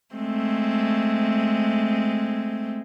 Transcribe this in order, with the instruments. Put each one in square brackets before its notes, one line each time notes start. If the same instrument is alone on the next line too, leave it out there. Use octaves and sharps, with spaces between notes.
[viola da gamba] G#3 A3 C4